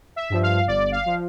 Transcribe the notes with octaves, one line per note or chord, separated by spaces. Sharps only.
E5
G2 F3
F5
G1 D5
F5
F3